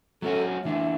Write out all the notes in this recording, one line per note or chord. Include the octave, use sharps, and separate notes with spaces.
F#3 A3 C#4 F#4 A4
E3 A3 D4 E5